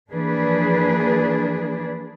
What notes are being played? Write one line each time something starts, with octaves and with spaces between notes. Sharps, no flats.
E3 F3 A#3 D4 G#4 B4